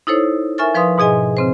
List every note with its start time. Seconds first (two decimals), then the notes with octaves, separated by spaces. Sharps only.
0.07 D#4 E4 A4 C5 C#5
0.58 A#4 E5 G#5 C#6 F6 A6
0.75 F3 B4 F5 C6 D#6
0.98 G#2 B2 G#4 D#5 G#5
1.37 C#3 C4 C5